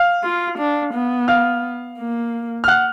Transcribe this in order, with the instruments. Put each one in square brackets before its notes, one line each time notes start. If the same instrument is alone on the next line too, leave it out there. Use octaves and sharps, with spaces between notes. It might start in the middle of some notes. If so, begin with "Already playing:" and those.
Already playing: [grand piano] F5 F6
[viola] F4
D4
B3
[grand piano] F5 F6
[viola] A#3
[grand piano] F6
F#5 F#6